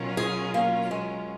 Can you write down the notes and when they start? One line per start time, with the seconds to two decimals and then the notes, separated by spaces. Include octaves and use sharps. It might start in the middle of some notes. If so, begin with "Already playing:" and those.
Already playing: B2 F#3 C#4 F4 A#4
0.17 G#4
0.54 A#3
0.91 G#3